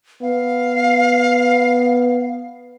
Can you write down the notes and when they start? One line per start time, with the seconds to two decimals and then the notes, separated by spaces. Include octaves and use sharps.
0.22 B3 F5